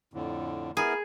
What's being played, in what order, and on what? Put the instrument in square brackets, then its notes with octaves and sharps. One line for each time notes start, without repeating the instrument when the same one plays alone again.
[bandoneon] F2 A2 D3
[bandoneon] B3 E4 A#4 [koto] G#4